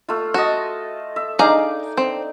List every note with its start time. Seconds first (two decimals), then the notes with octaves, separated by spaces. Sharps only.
0.09 A3 F4
0.34 F#4 D#5 A5
1.16 E5
1.39 D4 D#4 G#4 F5 A#5 D6
1.97 C4